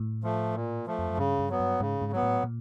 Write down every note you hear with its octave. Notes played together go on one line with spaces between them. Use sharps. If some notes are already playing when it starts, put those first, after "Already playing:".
Already playing: A2
F3 A3
A#2
F3 A3
F2
F#2
G2 C#3
G2
F#3 B3
G2
G#2 C#3
G#2
F#3 B3
A2
A#2